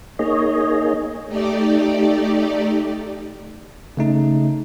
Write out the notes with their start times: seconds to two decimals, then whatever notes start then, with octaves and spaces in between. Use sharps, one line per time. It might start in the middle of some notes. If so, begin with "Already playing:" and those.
0.19 A#3 D#4 G#4 C#5 D#5
1.28 A3 D#4 G4 D5
3.97 C#3 A3 D#4